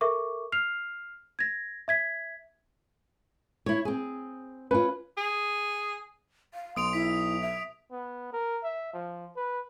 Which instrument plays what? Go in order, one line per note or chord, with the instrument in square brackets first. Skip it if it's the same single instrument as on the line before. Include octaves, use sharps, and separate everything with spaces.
[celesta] A4 A#4 E5 C#6 D6
F6 C7 F7
G#6 A#6
E5 G#6 B6
[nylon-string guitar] E4 C#5
C4 G#4
[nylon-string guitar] C#4 F4 [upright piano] B4
[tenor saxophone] G#4
[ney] F5
[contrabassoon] B1 [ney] C6 [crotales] D#6 D7 F7
[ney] E4 [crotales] B6
[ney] E5
[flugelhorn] B3
A#4
E5
F3
B4